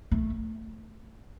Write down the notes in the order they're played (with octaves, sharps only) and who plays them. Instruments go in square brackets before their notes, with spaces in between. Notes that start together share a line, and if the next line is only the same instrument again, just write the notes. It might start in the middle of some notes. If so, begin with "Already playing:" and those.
[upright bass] A3